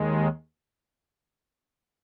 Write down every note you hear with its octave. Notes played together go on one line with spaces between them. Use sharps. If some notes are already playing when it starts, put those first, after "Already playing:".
Already playing: D#2 D#3 G#3